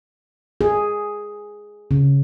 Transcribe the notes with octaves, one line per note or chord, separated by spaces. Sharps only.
G#4
C#3